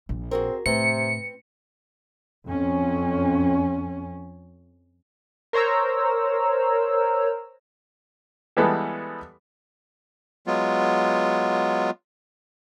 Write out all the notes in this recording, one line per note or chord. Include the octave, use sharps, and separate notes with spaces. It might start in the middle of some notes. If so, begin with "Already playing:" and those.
A#1 A#2
C4 F#4 G#4 A#4
A2 C3 C4 B4 C#7
F2 C#4
A#4 C5 C#5 A#5 E6
E3 G3 G#3 B3 A4
F#3 G#3 B3 F4